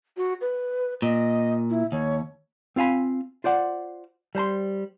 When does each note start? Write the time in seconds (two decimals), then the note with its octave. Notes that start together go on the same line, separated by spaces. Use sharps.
0.17 F#4
0.41 B4
1.02 A#2 D#5
1.70 E4
1.92 D#2 C#5
2.76 C4 F4 F5 G#5 B5
3.44 F4 C5 D5 F#5
4.35 G3 C5 A#5 C6